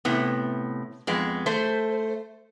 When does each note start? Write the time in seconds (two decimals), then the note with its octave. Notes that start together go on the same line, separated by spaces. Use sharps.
0.05 A2 C3 B3
1.07 F2 G#3 B3
1.46 A3 C5